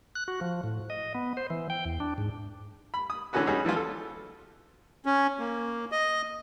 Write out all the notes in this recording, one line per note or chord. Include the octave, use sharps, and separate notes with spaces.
F#6
F#4
F3
A2
D#5
B3
C5
E3
G5
E2
D4
G#2
B5
D#6
D3 E3 A3 C#4 F#4 B4
G3 C#4 D#4 F#4 G#4
E3 F3 G3 F4
A4
C#4
A#3
D#5